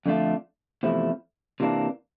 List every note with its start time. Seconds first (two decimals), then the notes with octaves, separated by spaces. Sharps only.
0.06 F2 D3 A3 D4 F4
0.83 E2 C3 F3 A3 E4
1.60 C3 E3 A#3 D4